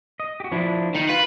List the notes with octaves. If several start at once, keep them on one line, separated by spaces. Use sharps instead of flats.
D#5
F#4 G4
F3 D4 E4
D#3
F4 B4